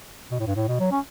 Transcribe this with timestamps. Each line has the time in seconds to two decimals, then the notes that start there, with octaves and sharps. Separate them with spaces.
0.31 B2
0.40 A2
0.47 G2
0.56 A2
0.68 B2
0.80 F#3
0.91 C#4